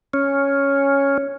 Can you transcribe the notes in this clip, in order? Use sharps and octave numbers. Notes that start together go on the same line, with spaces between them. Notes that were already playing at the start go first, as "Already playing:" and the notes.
C#4